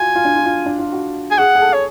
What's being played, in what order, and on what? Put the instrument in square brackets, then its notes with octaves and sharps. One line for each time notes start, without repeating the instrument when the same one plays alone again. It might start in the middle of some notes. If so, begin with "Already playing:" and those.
Already playing: [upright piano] F4 F#4 [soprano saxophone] G#5
[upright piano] F4
D4
F4
F4
D4
F4
F#4
[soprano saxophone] G#5
[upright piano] G#4 [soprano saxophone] F#5
[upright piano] G#4
A4
[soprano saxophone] C#5